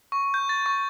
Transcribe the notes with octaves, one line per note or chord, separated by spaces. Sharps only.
C#6
G6
A6
C#6